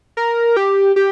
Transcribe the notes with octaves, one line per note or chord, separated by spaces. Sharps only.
A#4
G4
G4